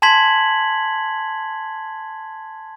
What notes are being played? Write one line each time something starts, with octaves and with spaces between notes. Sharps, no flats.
G#5 A5 C6 G#6 B6 F#7